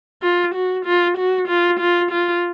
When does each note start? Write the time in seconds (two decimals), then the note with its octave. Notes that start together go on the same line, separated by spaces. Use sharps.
0.23 F4
0.54 F#4
0.85 F4
1.17 F#4
1.48 F4
1.79 F4
2.11 F4